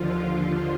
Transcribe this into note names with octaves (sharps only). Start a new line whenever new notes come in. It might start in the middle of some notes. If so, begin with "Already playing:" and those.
Already playing: D#2 D3 F3 F4
F4